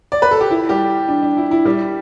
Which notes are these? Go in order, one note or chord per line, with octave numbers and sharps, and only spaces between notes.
D5
B4
A4
G4
E4
G3 G4
D4
D4
E4
E4
G3 G4